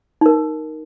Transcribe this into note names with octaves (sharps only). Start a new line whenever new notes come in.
D#4 A#4